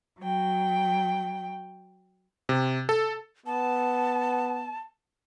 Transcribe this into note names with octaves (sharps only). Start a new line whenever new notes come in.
F#3 G5
C3
A4
B3 A5